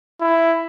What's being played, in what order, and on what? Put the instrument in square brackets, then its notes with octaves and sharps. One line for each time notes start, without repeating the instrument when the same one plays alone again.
[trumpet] E4